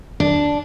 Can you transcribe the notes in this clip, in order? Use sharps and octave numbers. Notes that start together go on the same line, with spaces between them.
D4